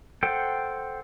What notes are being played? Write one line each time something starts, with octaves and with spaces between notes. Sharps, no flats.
A4 C5 F#5 G5